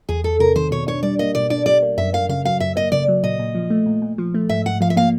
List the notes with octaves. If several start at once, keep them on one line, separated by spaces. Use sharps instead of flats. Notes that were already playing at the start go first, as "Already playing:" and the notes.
E2 G#4
E2 A4
C3 A#4
D#3 C5
B2 C#5
D4 C#5
G3 D5
A#3 D#5
B2 D5
D4 D5
G3 D5
A#3
F#2 E5
A#3 F5
C#3 F5
F#3 F5
F#2 E5
A#3 D#5
C#3 D5
F#3
A#2 D#5
A#2
F3
A3
A#2
A#2
F3
A3
G#2 E5
G#2 F#5
F3 F5
E5
A#3 F5